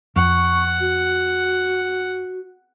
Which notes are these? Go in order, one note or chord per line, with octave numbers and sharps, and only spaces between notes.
F2 F#5 C#6
F#4